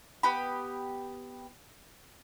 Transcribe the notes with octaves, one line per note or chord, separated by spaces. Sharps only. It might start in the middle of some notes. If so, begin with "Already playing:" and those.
B3 G4 B5